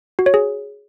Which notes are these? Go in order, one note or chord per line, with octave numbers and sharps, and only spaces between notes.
F#4
C#5
G#4